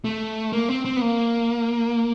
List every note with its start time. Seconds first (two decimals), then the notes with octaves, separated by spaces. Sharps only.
0.04 A3
0.52 A#3
0.69 C4
0.85 C4
0.97 B3
1.01 A#3